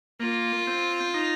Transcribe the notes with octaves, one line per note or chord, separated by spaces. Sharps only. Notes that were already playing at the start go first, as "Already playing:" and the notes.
A#3 F4
C4
D#4